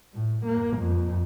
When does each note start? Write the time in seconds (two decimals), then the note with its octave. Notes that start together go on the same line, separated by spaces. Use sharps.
0.13 A2
0.46 A#3
0.78 F2